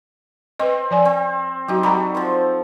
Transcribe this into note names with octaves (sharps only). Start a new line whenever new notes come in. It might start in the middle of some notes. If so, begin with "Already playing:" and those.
C4 B4 D#5
F3 D5 G#5
C4
F#3 D#4 F#4 G4
G3 F#4 A4 A#5 B5
F3 C4 C5